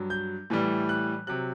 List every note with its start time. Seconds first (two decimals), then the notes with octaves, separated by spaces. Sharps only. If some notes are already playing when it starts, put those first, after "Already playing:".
Already playing: G2 F#3
0.10 G6
0.50 A2 E3 G3
0.89 F#6
1.27 C3 F#3 F#6